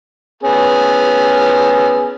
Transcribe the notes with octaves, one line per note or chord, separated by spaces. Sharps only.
B3 C#4 G#4